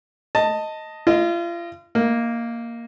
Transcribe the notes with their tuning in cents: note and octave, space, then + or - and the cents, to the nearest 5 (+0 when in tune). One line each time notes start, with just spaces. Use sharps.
D#5 +5 A5 +15
F4 -35 D#5 +0
A#3 +0 D#4 +25